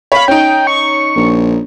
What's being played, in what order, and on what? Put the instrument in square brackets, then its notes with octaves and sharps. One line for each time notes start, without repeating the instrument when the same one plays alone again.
[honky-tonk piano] C#5 F5 [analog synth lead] B5
[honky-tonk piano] C#4 D#4 [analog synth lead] G5
[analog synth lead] C#6
[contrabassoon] A#1